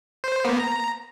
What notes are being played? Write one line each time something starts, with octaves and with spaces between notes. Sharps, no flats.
C5
A#3 B3
A#5